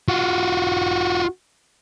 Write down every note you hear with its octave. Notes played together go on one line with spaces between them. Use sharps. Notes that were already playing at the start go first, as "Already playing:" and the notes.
F4 F#4